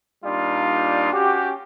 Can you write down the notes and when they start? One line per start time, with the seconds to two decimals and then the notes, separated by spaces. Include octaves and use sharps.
0.25 A#2 G3 D4 D#4 F4
1.13 C#4 F#4 G4